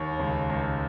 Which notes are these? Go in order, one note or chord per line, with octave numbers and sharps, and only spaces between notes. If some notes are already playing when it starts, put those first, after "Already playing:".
Already playing: D#2 C#5
C#2
C#2